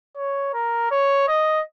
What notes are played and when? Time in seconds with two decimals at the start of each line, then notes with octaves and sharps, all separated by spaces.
0.16 C#5
0.54 A#4
0.91 C#5
1.28 D#5